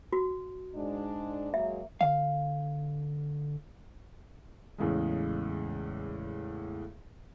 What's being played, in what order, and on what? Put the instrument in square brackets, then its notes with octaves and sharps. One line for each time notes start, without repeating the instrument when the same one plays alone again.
[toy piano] F#4
[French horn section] G#2 G#3 D4
[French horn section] F#3 G#3 A#3 [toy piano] E5
[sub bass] D3 [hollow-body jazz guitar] F5
[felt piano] E2 A2 C#3 G#3